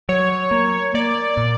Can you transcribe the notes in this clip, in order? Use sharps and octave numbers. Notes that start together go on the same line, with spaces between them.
F#3 C#5
A#3
A#3 D5
A#2